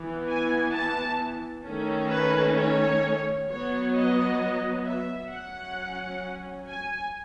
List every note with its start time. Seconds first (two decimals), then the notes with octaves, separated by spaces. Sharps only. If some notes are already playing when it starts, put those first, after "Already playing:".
Already playing: E3 B3
0.28 G#5
0.74 A5
1.65 D#3 A3 C#4
2.11 B4
2.56 C#5
3.48 F#3 B3 C#5
3.93 D#5
4.85 E5
5.30 F#3 C#4 F#5
6.68 G#5